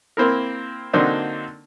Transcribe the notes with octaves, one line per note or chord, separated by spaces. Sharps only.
A#3 C4 E4 A#4
D3 F#3 A#3 C4 D4 D#4